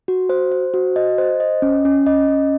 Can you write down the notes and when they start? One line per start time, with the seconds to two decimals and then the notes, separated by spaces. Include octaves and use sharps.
0.08 F#4
0.29 C5
0.52 C5
0.74 F#4
0.96 D#5
1.18 C5
1.40 D#5
1.62 C#4
1.85 C#4
2.07 D#5
2.28 C#4